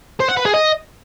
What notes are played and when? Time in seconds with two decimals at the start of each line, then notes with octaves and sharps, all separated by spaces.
0.20 C5
0.29 F#5
0.37 B4
0.45 G#4
0.54 D#5